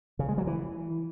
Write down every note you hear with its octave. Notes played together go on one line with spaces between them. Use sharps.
C#3
G#3
F#3
E3